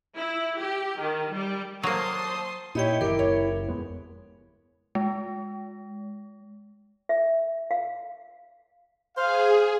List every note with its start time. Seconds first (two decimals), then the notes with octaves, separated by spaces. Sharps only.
0.17 E4
0.58 G4
0.99 D#3
1.33 G3
1.84 F#3 G3 A#3 C5 A5 C6 D#6
2.75 A#2 D#4 E4 G4 C#5 D#5 G5
3.01 F#1 D#3 G4 A#4 E5
3.19 F#1 C#5
3.68 F2 G#3 B3
4.95 G#3
7.09 E5
7.71 F5
9.18 G#4 C5 F5